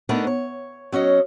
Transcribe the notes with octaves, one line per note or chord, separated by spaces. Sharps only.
A3 B3 D4 D#4 A#4 B4
C#5
F#3 C#4 C#5 D#5